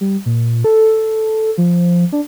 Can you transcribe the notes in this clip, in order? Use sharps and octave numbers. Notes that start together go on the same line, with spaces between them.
G3
A#2
A4
F3
D4